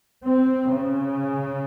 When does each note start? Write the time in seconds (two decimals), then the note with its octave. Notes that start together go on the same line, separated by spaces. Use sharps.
0.24 C4
0.69 C#3